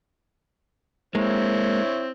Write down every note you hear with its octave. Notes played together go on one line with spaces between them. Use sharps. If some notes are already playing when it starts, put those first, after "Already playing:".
G#3 A#3 C4 E4 C#5